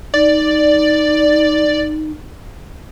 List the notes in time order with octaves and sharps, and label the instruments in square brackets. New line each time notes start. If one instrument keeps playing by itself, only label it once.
[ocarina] D#4 [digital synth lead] D5